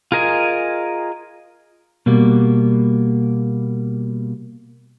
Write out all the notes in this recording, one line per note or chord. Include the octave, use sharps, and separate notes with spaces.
F4 G#4 A#4 D#5 G#5
B2 G3 A#3